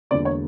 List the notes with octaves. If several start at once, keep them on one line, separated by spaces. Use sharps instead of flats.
E1 E2 D3 A#3 D5
C#5